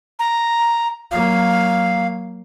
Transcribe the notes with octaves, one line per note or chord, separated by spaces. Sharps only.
A#5
F#3 A#3 F5